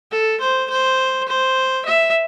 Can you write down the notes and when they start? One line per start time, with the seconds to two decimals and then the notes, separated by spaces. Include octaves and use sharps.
0.11 A4
0.40 C5
0.70 C5
1.28 C5
1.85 E5